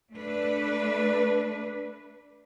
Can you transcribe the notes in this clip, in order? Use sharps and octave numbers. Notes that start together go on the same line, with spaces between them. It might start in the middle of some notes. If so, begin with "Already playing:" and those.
A3 D4 B4